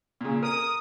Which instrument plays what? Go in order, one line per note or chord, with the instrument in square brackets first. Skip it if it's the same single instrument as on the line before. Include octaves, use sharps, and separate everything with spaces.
[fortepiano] A#2 C#3
[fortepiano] A#4 [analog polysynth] D#6